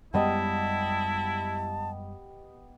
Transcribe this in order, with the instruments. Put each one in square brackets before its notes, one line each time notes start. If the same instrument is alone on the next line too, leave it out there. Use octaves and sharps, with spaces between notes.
[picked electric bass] F#2 G3 G#3 [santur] B3 G4 D#5 [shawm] E4 [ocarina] A5